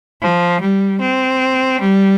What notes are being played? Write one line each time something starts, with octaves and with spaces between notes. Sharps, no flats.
F3
G3
C4
G3